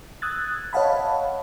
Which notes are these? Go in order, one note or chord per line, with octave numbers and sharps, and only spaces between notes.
D#6 E6 F#6 G#6 A6
C#5 D#5 F5 F#5 A5 B5